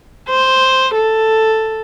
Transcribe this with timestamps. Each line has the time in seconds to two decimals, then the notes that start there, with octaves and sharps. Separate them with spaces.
0.30 C5
0.95 A4